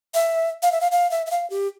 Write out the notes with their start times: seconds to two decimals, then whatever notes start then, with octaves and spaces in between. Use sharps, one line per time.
0.14 E5
0.62 F5
0.72 E5
0.81 F5
0.92 F5
1.11 E5
1.26 E5
1.31 F5
1.50 G4